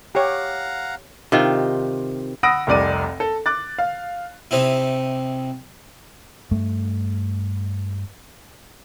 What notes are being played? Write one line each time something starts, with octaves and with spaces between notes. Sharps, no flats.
G4 C#5 F5 F#5 A#5
C3 D#3 F4
F#5 B5 D#6 E6 A#6 D7
F1 C2 D5 D#7
A4
D6 F#6 A6
F5
C3 C4 D#4 E4
G2 A3